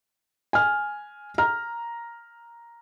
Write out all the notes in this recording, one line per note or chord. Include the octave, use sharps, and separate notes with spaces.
G#5 F6
A#5 F6